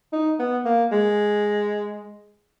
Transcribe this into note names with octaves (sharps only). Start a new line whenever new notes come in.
D#4
B3
A#3
G#3